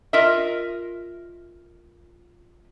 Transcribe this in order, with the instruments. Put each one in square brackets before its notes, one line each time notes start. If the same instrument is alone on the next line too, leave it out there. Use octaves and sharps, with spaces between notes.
[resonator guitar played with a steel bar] F4 A#4 D#5 E5